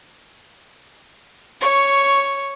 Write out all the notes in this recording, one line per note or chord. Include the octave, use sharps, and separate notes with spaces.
C#5 C#6